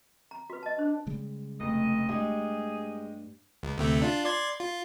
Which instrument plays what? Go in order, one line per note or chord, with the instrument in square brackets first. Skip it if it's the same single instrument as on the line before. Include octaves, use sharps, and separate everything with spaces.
[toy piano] A#5
F#4 B4
D#5 A5
[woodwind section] D4 [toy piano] C5
[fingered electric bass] C#3 G3 G#3
[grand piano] F1 [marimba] A3 [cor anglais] D#5
[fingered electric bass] G2 [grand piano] G#3 G4 D#5 [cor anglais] G#4
[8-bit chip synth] C#2
D2 C3 A3
D4 F4
D5 C6 G#6
F4